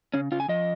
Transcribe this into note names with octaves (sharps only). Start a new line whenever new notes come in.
C#3 C#4
C#3 F4
G#5
F3 D#5